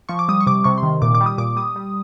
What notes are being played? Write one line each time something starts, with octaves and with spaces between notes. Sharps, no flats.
F3 C#6
D6
G3 D#6
C#6
C3 D6
C3 C#6
C6
D#3
A#2 D6
D6
G3
D#6
A#2 D6
G3 D#6
G3